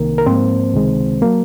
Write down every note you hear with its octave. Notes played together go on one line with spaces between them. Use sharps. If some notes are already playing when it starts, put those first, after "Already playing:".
Already playing: C2 C3 D#3 A#3 A#4
A#4
G#2 F3 A#3 C4 C5
C#2 C3 D#3 G#3
F#3 A#3 A#4